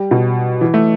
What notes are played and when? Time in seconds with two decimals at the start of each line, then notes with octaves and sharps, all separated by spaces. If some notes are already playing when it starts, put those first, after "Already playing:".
Already playing: G3
0.11 B2
0.61 E3
0.74 A3